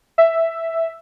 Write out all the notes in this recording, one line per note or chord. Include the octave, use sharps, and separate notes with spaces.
E5